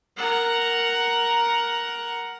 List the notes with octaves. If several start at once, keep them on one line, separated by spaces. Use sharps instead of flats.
A#4 F#5